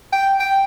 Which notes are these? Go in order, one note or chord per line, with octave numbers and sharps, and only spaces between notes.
G5
G5